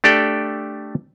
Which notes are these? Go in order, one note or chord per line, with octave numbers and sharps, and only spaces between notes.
A3 D4 G4 A4 D5 G5